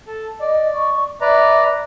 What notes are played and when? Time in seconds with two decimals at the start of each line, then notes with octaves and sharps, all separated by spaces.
0.07 A4
0.40 D5 D#5
0.74 C#6
1.21 B4 D5 E5 A#5